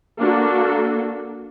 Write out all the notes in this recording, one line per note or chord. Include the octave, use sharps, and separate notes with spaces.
A#3 D4 F#4 A4